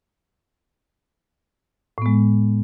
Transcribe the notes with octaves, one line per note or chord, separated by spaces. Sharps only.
A2 G#3 B3